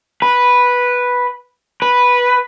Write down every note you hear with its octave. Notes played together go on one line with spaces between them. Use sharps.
B4
B4